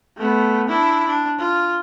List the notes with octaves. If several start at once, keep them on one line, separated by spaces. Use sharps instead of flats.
A3 B3
D4 E4
D4
F4